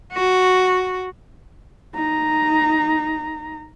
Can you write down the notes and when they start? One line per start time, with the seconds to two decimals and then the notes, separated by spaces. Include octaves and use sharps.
0.13 F#4
1.94 D#4 A#5